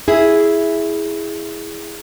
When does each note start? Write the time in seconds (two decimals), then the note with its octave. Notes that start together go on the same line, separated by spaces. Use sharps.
0.08 E4 G#4